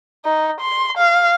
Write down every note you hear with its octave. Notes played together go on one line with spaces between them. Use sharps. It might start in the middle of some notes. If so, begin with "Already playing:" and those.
D#4
C6
F5